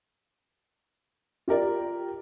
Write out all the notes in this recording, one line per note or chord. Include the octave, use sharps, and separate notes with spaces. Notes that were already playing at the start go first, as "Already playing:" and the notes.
F4 G4 A#4 D5